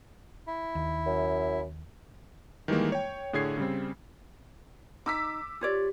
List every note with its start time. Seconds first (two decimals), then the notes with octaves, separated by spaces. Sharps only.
0.47 E4
0.75 D#2
1.06 F#2
2.68 D#3 E3 G3 G#3 A#3
2.92 C#5 G5
3.33 A2 D3 G#4 C#5 G#6 C7
3.57 C#3 G3 C4
5.06 D#4 D6 E6 B6
5.61 F4 G4 C#5 D5